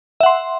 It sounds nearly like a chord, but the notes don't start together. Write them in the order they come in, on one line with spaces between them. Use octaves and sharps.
E5 F#5 C6